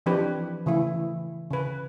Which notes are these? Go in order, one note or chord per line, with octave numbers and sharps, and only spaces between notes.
E3 F3 C4 D4 G4 B4
C#3 E3 A3 E4
C#3 B4